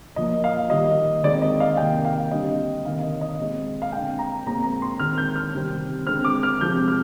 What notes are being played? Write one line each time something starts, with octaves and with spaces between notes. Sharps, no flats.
A#2 F3 A#3 D#5
F5
D#3 G3 A#3 D#5
D#3 G#3 C4 D5
D#5
F5
C3 D#3 A#3 G5
F5
D3 G3 C4 D#5
C3 D#3 A#3 F5
D#5
D#5
A#2 G#3 C4
F5
D3 G#3 C4 G5
A#5
A#2 G#3 C4 A#5
A#5
C6
D#3 G#3 C4 F6
G6
F6
C3 D#3 G3 C4
D3 G#3 C4 F6
D6
F6
C3 F3 G#3 C4 G6
F6